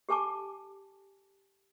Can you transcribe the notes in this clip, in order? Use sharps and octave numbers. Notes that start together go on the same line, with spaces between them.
G4 A4 G#5 A5 D6